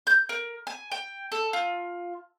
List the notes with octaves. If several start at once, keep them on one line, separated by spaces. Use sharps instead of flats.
G6
A#4
G#5
G5
A4
F4